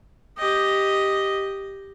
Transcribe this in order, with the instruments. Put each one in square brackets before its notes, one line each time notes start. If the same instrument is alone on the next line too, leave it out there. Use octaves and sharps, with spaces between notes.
[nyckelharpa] G4 D#5